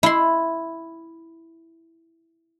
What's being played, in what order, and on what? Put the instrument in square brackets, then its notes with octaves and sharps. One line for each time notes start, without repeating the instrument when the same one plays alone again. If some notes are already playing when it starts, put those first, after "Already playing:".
[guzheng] E4 C6